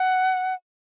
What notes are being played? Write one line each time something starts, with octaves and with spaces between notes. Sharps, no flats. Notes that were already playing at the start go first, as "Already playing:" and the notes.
Already playing: F#5